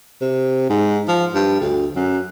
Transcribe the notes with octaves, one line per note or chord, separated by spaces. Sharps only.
C3
G#2
F3
G2
D2
F#2